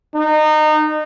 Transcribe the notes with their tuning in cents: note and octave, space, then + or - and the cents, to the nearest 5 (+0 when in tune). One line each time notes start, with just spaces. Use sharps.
D#4 -25